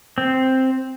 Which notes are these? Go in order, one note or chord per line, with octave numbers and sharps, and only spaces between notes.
C4